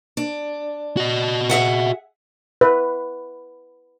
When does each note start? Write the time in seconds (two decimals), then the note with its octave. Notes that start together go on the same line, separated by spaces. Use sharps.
0.17 D4
0.97 F#4 D#5
1.49 G#4 E5 F#5
2.61 B4